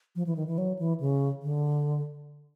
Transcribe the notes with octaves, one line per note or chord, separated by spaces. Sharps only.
F3
E3
D#3
E3
F#3
E3
C#3
D3